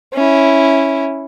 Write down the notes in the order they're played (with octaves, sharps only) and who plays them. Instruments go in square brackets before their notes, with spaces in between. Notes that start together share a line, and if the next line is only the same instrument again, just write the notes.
[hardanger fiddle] C#4 E4